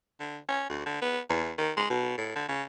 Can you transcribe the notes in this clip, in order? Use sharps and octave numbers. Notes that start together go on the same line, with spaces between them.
D3
C#4
D2
D3
B3
E2
D#3
G#3
B2
A2
D3
C#3